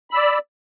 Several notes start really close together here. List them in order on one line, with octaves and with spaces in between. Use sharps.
B5 E6 D5